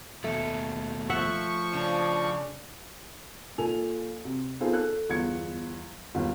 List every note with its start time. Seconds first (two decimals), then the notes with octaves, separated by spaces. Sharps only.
0.24 D#2 B2 A3
1.10 F3 E5 F#5 C#6
1.74 C#3 D4
3.58 A#2 A4 G#5 F7
4.25 C3
4.60 B3 D#4 F4 G#4 A4 C5
4.73 A4 F#6
5.09 G1 E2 G#6 C#7
6.15 G1 D#2